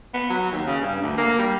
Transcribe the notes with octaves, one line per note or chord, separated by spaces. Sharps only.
B3
F#3
D#2
C#3
G2
D2
A#3
G3